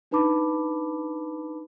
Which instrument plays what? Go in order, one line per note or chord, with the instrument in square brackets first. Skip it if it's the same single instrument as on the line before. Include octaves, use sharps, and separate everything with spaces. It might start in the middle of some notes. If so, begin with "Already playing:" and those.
[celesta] D4 D#4 B4 A5 B5 D6